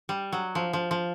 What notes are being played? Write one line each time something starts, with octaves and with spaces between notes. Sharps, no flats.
G3
F#3
F3
F3
F3